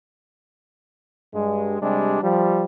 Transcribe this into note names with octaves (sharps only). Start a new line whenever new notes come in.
G2 G#3
C3 G3 G#3 D4
F3 G3